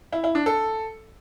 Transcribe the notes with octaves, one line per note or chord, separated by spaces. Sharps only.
E4
E4
D4
A4